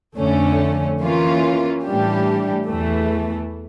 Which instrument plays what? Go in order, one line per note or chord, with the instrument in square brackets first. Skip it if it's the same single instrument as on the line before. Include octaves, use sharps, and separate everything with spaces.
[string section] F2 D3 A3 C#4
E3 A#3 C#4 F4
A2 E3 G3 D4 G4
E2 E3 A3